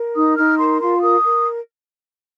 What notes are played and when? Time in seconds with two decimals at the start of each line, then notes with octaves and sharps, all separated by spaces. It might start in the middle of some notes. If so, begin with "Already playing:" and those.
Already playing: A#4
0.15 D#4 D#6
0.36 D#4 F6
0.58 A#4 C6
0.79 F4 C6
1.01 A#4 D#6
1.22 A#4